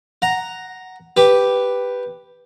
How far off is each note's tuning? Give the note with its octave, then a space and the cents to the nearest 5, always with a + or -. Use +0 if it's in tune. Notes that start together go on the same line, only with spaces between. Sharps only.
F#5 +5 A#5 +0
G4 +0 B4 +0